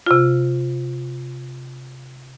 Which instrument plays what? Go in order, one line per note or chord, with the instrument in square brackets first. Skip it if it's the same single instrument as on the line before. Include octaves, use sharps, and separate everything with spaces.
[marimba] C3 F4